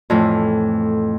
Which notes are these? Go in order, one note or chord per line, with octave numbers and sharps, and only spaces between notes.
F2 A2 E3